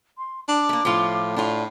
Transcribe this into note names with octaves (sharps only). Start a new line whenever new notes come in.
C6
D4 D6
A3 A#3
A2 F3 F4
A2 D4 F4